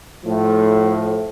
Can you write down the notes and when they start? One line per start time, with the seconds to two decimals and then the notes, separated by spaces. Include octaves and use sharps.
0.25 A2 F3